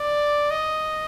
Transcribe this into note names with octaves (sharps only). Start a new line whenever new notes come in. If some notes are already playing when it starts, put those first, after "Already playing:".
Already playing: D5
D#5